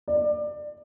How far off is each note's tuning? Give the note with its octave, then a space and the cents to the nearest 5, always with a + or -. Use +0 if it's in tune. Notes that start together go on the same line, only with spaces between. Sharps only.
D5 +25